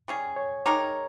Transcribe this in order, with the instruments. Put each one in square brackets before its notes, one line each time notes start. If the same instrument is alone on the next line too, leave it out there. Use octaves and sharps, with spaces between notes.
[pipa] G3 C#4 G#4
[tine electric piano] C#5
[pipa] G#3 D#4 G4 A#4 [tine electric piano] C#5